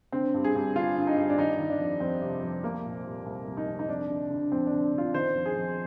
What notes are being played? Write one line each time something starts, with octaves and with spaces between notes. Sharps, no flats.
D3 C4
G2
G#4
G2
D3 F4
D3
D#4
G2
D4
D#3 D#4
D#3
D4
F2
F2 C4
C3
F2
C2 A#3
A#2
C2
C2
C2
D#4
C2
D#4
F2 D4
D3
D3
F2 C4
D4
D3
D3
F4
D#3 C5
F2
G#4
F2